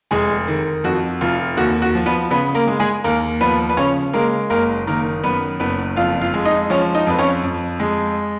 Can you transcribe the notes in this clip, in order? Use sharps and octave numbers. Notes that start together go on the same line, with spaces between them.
F1 G#3 G#4
D#3
F2 F#4
F1 F4
D#2 F#4
F#4
F3
B3 B4
C#3 B3 B4
A#3 A#4
G#3
G#3 G#4
D#2 A#3 A#4
F3 B3 B4
B4
C#3 C#4 C#5
G#3 A#3 A#4
F#1 A#3 A#4
D#3 A#3 A#4
F#2 B3 B4
F#1 B3 B4
F2 F4 F5
F4 F5
G#3
D#4 D#5
F3 C#4 C#5
D#4 D#5
F2 B4
C#4 C#5
F2
G#3